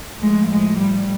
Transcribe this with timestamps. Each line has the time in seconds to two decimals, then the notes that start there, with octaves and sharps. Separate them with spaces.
0.19 A2 F3 G#3
0.49 G#3
0.79 G3